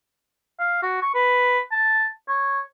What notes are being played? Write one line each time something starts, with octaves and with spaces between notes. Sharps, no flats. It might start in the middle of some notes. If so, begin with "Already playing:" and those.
F5
F#4
C#6
B4
A5
C#5